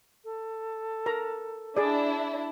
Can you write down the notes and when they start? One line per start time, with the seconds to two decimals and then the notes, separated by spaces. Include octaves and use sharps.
0.24 A4
1.06 A#4 A#5
1.77 D4 E4 G#4 D5